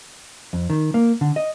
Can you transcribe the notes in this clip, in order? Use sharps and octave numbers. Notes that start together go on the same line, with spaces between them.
F2
D#3
A#3
D3
D#5